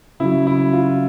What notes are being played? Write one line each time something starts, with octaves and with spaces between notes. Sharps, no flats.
C#3 F#3 E4
E4
F4